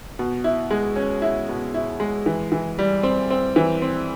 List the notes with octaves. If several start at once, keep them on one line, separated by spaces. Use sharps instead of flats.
B2
E4
G#3
C#4
E4
B2
E4
G#3
E3
E3
G3
C4
C4
E3
C4